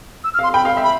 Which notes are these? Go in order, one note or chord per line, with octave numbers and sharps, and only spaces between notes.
E6
F6
F5 C6
G5 B5
F5
E5
B5